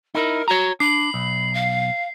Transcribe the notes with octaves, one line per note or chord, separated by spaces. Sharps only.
D#4 E4 A#4
F#4 C#5 A#5
D4 B5 C7
B1
F5